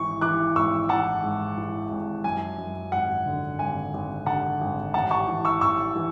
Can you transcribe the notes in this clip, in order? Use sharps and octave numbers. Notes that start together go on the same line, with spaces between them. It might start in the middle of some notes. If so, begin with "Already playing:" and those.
Already playing: G#1 E3 C#6
E3 D6 F#6
G#1 C#6 E6
E3 F#5 A5
G#2
E3
G#1
F#2 G#5
F#2
G#1 F#5
D3
G#1 G#5
G#1
D3 F#5 A5
G#1
A1 F#5 A5
A5 C#6
E3
C#6 E6
A1 C#6 E6
E3